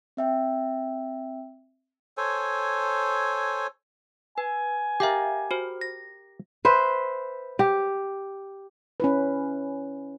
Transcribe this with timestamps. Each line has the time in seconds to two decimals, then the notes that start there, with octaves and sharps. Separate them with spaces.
0.17 C4 E5 G5
2.17 A4 C5 C#5 G#5
4.38 B4 G#5
5.00 G4 A#4 E5 F5 G5
5.51 F#4 C5
5.81 A#6
6.65 B4 C5 E5
7.59 G4
9.00 C#4 E4 B4